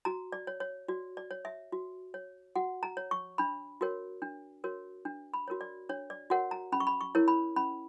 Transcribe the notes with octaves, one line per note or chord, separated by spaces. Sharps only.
F#4 A#5
D5
C#5
C#5
F#4 D5
D5
C#5
E5
F#4
C#5
F#4 F#5
A#5
C#5
C#6
D4 B5
F#4 A#4 C#5
D4
F#4 A#4 C#5
D4
B5
F#4 A#4 C#5
D5
D4 C#5
D5
F#4 A#4 C#5 F#5
A#5
C#4 B5
C#6
B5
C#6
E4 A#4 C#5
B5
C#4 B5